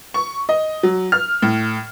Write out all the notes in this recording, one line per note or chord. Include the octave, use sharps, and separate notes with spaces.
C#6
D#5
F#3
F6
A2